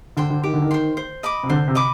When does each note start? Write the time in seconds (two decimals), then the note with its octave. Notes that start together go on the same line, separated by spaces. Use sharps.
0.17 D3 C5 G5 C6
0.30 D3
0.43 D#3 G4
0.53 D3
0.62 D#3
0.71 C5 G5 C6
0.97 C5
1.23 D#5 B5 D6
1.43 C3
1.50 D3 C5
1.68 C3
1.75 D#5 B5 D6